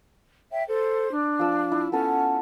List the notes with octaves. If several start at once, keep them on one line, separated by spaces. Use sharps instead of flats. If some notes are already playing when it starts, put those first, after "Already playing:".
C#5 E5 G5
A4 C5
D4
F3 E6
E4
B3 C#4 A4 B4